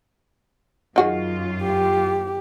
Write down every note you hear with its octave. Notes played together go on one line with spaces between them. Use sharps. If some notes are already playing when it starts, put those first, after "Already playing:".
F#2 D#3 F4 F#4 G#4
G4